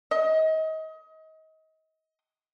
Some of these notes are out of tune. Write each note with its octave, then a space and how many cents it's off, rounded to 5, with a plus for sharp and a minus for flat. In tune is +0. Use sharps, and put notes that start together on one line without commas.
D#5 +30